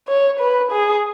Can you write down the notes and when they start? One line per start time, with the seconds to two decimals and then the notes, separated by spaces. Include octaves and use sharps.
0.08 C#5
0.40 B4
0.71 G#4